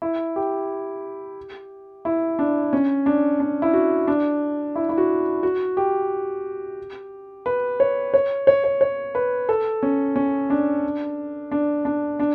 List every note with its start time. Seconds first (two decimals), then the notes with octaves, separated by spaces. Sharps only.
0.02 E4
0.36 G4
2.05 E4
2.39 D4
2.73 C#4
3.06 D4
3.40 D4
3.62 E4
3.73 F#4
4.08 D4
4.76 E4
4.89 E4
4.98 F#4
5.43 F#4
5.77 G4
7.46 B4
7.80 C#5
8.14 C#5
8.47 C#5
8.64 C#5
8.81 C#5
9.15 B4
9.49 A4
9.83 C#4
10.16 C#4
10.50 D4
11.52 D4
11.85 D4
12.20 D4